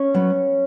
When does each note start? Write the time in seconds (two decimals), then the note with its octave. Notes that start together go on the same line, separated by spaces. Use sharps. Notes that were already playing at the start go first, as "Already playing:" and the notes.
Already playing: C#4 C#5
0.14 F#3 B3